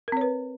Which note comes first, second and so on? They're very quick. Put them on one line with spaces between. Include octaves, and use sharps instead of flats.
A#4 C4 C#5 B4